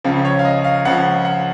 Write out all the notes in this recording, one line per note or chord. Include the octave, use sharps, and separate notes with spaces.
C#2 C#3 F3
C#5
F5
D#5
F5
C#2 C#3 F3 F#5
F#5